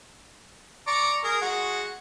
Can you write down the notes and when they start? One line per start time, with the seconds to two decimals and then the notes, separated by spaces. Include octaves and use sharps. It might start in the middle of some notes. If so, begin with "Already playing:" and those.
0.87 D5 A#5 C#6
1.24 G#4 A#4
1.41 G#3 F#4